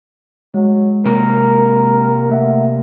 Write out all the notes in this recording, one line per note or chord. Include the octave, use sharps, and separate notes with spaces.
F#3 G#3
C3 A#3 A#4
A3 E5 F#5